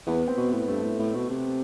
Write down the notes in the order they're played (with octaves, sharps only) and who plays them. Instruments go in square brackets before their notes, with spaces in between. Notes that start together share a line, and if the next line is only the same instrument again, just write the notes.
[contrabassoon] E2 [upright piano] B3
[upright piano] C4
[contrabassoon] B2
[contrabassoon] A2 [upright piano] B3
[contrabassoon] G2 [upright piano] A3
[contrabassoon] A2
A2
B2
C3